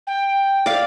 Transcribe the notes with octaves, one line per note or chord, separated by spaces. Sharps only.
G5
D5 F5